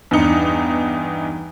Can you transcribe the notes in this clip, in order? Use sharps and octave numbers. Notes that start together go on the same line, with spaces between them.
E2 G2 D#4 C#7